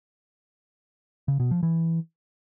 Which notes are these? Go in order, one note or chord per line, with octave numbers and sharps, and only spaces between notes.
C#3
B2
F3
E3